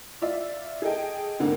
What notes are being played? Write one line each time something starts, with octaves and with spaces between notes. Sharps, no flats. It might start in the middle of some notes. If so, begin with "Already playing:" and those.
F4 D5 E5
G#4 A4 D#5 G5
D2 G#2 D3 A#3 C4